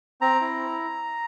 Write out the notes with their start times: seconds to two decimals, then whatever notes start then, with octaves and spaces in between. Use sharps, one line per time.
0.21 C4 A#5
0.41 E4